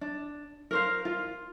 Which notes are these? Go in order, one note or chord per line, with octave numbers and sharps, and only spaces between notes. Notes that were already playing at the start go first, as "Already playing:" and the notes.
D4
A#4 C5 F5
F4